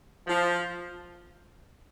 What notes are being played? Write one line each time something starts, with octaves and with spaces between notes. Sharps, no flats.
F3